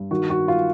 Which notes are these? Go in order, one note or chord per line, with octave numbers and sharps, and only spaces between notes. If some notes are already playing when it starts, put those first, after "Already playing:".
Already playing: G2
D#3 F#4
F#4
F4